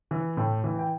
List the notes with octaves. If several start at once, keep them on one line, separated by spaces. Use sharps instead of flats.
E3
A2 G5
E3
G5